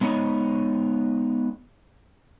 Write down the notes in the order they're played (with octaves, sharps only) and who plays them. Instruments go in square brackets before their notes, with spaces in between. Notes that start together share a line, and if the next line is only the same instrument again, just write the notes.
[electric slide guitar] G#3 B3 D#4 C#5 D#5